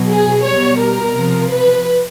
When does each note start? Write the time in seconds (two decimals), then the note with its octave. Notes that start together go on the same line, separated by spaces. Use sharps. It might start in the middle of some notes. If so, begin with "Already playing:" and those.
Already playing: B2 F#3
0.08 G#4
0.44 B2 G3 C#5
0.79 A#4
1.14 C3 F3
1.50 B4